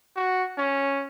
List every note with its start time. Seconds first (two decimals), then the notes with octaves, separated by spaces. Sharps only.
0.16 F#4
0.58 C#4